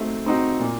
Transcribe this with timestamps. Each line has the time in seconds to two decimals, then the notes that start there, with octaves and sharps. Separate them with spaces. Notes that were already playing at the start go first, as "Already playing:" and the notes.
Already playing: A3 C4 D#4 F#4
0.26 C4 D#4 F#4
0.60 A#2